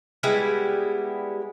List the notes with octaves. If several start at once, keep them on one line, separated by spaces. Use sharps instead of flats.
G3 G#3 B3 E4